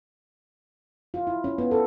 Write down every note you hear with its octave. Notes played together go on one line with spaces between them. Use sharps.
F4
E4
C#4
B3
A4